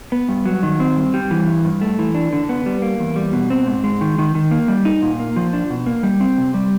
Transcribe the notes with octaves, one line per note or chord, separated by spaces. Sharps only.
B3
G2
F#3
D#3
C4
G2
G3
E3
G2
G2
A3
E3
D4
D3
B3
G3
A#3
E2
G3
B2
C4
G#2
G#3
D#3
D#3
D#3
A#3
G3
D#4
A#2
A#3
F3
D4
B2
A#3
G3
C4
C3
G3